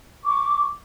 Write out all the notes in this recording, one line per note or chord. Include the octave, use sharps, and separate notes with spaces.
C#6 D6